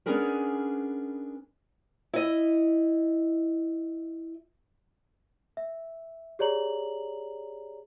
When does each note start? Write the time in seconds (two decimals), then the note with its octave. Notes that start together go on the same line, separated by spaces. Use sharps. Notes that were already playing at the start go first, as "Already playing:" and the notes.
0.06 B3 C#4 D4 G#4 A#4 B4
2.13 E4 D#5
5.57 E5
6.39 G4 G#4 C#5 D5 A#5 F#7